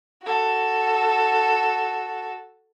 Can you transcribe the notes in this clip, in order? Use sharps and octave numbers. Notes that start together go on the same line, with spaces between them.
F#4 A4